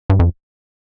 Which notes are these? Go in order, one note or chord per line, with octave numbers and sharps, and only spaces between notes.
G2
F2